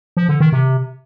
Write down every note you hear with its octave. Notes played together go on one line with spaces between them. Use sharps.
F3
D3
D#3
C3